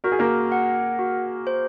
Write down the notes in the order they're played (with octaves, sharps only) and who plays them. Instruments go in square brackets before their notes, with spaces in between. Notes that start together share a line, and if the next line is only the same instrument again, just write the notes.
[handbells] F#4 [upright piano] A#4
[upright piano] G#4
A#3 A#4
[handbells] F#5
F#4
C5